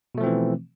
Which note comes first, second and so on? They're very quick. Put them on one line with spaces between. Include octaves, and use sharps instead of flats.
B2 A3 F3 C4 E3